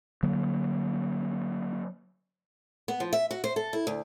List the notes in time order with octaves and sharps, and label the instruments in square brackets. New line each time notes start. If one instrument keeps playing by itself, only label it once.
[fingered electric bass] D3 F#3 A#3
[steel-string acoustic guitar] B3
F3
E5
F#4
C5
A4
E4
D2